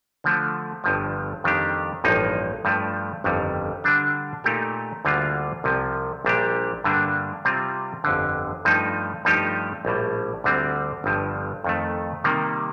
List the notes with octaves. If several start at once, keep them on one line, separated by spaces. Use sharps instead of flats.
D3 F3 A3
G1 G2 F3
F2 D#3 G3 D4 G4
A1 G2 F3 A#3 D#4
G2 F3 A3
G1 F2 D#3 G3
D3 G3 D4
A#2 A3 D#4 G4 A#4
D2 D3 G3 A#3 F4
C2 C3 F3
A#1 A#2 G3 D4 G4
G2 D3 G3 A#3 D4
C3 G3 C4 F4
G1 F2 D3
G2 F3 A3 D#4
G2 F3 A3 D#4 G4
A#1 A2 G3
D2 D3 G3 C4
G1 G2 F3
F2 D#3 A3
C3 D#3 G3 A#3